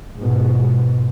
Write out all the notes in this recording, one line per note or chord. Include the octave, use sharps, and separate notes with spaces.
G#2 B2